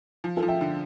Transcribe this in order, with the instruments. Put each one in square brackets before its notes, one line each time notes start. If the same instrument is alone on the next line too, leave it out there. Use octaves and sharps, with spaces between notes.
[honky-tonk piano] F3
[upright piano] F4 A4
[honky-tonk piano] F3
[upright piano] E5 G5
[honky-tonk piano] D3